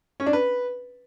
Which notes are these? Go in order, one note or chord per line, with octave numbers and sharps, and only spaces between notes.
C#4
D4
B4